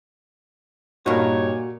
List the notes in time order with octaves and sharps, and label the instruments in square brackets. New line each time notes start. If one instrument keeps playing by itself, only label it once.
[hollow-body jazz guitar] G2 D#4 [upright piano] A#2 [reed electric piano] F#4 A#4 [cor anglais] C#5